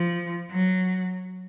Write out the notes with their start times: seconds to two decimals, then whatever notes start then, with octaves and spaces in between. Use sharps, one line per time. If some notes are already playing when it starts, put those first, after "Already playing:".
Already playing: F3
0.51 F#3